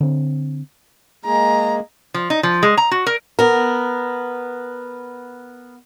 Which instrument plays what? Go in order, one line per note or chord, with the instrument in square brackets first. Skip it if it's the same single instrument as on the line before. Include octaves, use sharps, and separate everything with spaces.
[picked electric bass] D3 C4
[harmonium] G#3 A#3 G#4 [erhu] A#5
[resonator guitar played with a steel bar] F3
D#4
F3
G#3
A#5
F#4
A#4
[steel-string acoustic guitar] B3 A#4